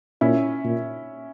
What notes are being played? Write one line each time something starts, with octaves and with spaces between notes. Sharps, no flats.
A#2 C#4 E4
A#2